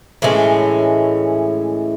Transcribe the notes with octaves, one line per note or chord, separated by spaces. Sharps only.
A2 E3 G#3 C#4